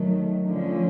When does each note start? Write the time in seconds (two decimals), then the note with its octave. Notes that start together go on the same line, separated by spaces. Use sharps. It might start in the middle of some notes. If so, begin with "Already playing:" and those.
Already playing: D#3 F#3 A3
0.46 D3 F3 A3 C#4